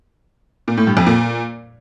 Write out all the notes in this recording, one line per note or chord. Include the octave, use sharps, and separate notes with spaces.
A#2
A2
G2
F2
A#2